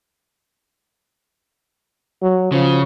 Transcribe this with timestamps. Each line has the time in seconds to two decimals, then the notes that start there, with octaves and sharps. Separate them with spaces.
2.22 F#3
2.52 C#3 F3